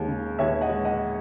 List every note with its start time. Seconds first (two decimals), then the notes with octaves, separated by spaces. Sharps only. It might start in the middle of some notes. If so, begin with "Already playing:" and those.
Already playing: D#2 G#3
0.08 C#3
0.39 D#2 C#5 E5
0.61 D#5 F#5
0.70 G#3
0.84 D#5 F#5